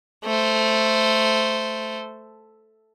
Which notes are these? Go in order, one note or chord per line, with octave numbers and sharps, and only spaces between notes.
A3 C5